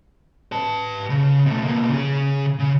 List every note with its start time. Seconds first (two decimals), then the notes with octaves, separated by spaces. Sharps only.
0.52 B4 A5
1.10 C#3
1.46 B2 A3
1.64 B2 A#3
1.90 C#3 G#4
2.59 C#3